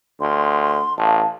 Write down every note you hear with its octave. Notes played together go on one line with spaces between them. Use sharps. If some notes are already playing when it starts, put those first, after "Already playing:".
D2 C6
A1 F5 A5